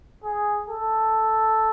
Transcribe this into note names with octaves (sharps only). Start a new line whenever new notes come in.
G#4
A4